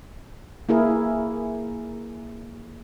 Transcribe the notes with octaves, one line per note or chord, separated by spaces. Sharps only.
A#3 E4 G#4 A#4